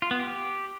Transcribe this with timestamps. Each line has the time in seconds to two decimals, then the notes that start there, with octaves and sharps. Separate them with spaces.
0.02 F4
0.11 B3
0.20 G4